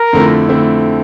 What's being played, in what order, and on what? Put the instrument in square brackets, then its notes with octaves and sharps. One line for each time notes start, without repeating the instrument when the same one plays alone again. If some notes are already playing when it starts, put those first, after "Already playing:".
Already playing: [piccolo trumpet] A#4
[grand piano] F2 D3 A3 C4 E4
D3 A3 C4 E4